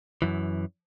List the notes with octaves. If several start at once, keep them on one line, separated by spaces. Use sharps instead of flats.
F#2 E3